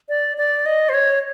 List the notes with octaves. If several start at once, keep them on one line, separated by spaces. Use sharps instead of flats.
D5
D5
D#5
C5
C#5